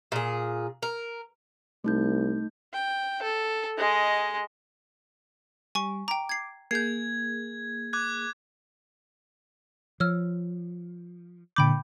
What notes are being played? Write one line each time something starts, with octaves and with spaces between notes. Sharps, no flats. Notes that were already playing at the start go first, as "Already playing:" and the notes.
A#2 G#4
A#4
C2 A3 D#4 G6
G5
A4
G#3 D#5
G3 G#5 C#6
G5 A#5 D6
G#6 C7
A#3 G#4 G6 G#6 C7
D6 F#6 G#6
F3 C#5 E6 F6
A#2 D3 G5 B5 D6 G6